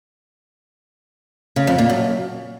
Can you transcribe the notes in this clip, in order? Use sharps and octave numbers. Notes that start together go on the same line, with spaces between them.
C#3
F2
A#2
F#2